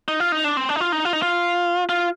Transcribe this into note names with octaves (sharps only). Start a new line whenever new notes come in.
D#4
F4
D#4
D4
C4
D4
D#4
F4
D#4
F4
D#4
F4
F4